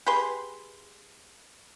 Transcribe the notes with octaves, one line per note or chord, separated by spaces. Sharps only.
G4 G#4 B4 C6